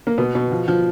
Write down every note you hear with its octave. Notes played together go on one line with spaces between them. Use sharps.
A#3
B2 B3
B2
F3
F3